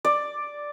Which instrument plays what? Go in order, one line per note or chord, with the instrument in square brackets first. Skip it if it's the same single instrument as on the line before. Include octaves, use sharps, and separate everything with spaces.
[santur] D5